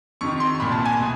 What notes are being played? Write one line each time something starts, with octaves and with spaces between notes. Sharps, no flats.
F2 C3 D#3 C#6
C6
C2 A#2 B5
A5
G#5
B2